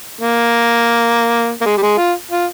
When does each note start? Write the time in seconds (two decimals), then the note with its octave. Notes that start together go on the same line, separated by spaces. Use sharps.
0.21 A#3
1.61 A#3
1.66 G#3
1.77 G3
1.82 G#3
1.98 F4
2.31 F4